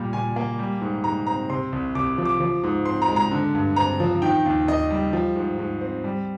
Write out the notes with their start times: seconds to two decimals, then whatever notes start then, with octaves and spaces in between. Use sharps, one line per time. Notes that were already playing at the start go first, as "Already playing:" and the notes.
Already playing: A#2 G3
0.13 A#2 G#5
0.36 A#3
0.59 G3
0.81 G#2
1.04 G#2 A#5
1.27 C4 A#5
1.49 C3 C6
1.72 C2
1.95 C2 D6
2.18 F3
2.25 D6
2.40 F3
2.63 G#2
2.86 C4 C6
3.02 A#5
3.08 G#3
3.16 A#5
3.31 D3
3.55 G2
3.76 C4 A#5
4.00 F3
4.22 D#3 G5
4.46 D#2
4.68 D#2 D#5
4.91 G3
5.13 F3
5.36 G#2
5.59 G#2
5.81 C4
6.04 G3